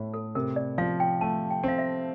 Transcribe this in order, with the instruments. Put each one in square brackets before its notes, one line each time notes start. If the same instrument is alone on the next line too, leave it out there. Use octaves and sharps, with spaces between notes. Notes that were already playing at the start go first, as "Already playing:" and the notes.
Already playing: [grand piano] A2 A3
[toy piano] A4
[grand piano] C3 [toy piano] A#4
[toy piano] D5
[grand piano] F3 [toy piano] F5
[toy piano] G5
[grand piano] A3 [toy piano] A5
[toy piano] G5
[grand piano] C4 [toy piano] F5
[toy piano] E5